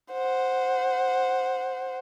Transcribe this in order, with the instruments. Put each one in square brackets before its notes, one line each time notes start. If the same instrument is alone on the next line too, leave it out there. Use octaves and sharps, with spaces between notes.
[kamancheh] C5 F#5